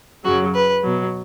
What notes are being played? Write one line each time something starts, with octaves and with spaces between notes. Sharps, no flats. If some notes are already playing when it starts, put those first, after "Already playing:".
F#2 C#3 F#3 F#4
B4
B2 F#3